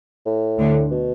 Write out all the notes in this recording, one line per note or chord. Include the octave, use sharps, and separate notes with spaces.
A2
D2 D3
B2